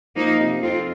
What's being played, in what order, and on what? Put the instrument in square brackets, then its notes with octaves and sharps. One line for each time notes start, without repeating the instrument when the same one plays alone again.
[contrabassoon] F3 [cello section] A#3 D#4
[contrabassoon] C3
[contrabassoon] F2 [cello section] C4 F4